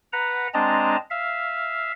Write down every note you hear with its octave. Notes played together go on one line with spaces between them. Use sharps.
B4 F#5 A#5
G#3 C4 D4 D#5 A5 A#5
E5 F5